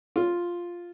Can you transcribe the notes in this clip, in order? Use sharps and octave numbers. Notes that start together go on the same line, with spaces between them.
F4